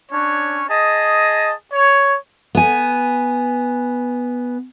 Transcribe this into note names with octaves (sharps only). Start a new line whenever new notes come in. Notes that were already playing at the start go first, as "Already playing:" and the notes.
C#4 D4 C#5
G#4 D#5 A5
C#5
B3 G#5